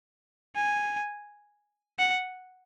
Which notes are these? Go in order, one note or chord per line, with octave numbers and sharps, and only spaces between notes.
G#5
F#5